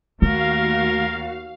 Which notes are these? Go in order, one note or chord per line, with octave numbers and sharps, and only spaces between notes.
D#2 A3 F#4 A#4 F5